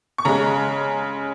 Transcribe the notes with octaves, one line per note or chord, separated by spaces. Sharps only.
C#6
C#3 G#3 A#5